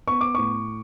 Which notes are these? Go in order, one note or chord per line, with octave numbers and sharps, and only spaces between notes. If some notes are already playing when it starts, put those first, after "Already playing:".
B3 C#6
D6
A2 C#6